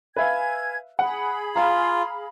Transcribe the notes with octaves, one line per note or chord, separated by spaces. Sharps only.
B4 E5 F5 G#5 G#6
G#4 F#5 B5
F4 F5 A#5